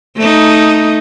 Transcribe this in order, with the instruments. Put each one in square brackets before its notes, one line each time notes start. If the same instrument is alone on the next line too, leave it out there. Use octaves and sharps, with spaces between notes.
[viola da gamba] A3 D#4